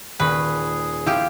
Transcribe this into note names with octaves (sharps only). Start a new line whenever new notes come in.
D#1 G#4 B4 C#6
F3 E4 F4 G4